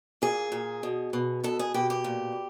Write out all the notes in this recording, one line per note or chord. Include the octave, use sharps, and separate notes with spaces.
A#2 G#4
A#2
B2
B2
B2 A4
G#4
B2 G4
G4
A#2